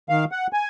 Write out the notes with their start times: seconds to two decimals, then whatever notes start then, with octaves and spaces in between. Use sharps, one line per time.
0.09 D#3 F5
0.31 F#5
0.53 G#5